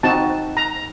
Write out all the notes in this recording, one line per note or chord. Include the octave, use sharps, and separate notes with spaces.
C4 D#4 F#4 A5
A#5